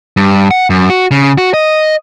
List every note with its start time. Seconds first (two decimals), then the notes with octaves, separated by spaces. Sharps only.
0.17 G2
0.51 F#5
0.70 F#2
0.89 F#4
1.11 C#3
1.38 F#4
1.54 D#5